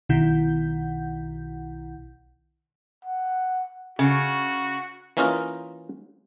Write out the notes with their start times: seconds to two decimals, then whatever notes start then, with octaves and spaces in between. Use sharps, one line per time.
0.09 B1 B2 D#3 E4 F#5 G6
3.05 F#5
3.99 C#3 F#4
5.17 E3 A#3 C#4 D#4 F4 A#4